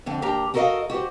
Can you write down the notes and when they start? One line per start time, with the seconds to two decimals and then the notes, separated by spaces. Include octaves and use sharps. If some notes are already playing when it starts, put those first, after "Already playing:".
0.06 F2 D3 C4
0.22 D#2 D4 G4 A#4 A#5
0.54 F#4 A4 A#4 C5 D#5 F5
0.90 F#4 G4 A#4 C5